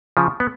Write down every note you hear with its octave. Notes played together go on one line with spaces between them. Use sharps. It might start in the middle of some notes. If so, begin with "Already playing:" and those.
C#3 F3
B3